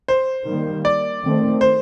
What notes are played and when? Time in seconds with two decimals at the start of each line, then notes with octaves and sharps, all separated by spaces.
0.08 C5
0.47 D#3 G3 A#3
0.85 D5
1.23 D#3 A3 C4
1.61 C5